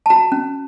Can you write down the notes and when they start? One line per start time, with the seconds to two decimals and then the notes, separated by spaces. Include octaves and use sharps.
0.06 A5
0.10 F#4 A#5
0.32 C#4